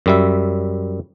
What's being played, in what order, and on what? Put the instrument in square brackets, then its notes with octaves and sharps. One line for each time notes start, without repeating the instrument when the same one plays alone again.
[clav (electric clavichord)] F#2 G3 E5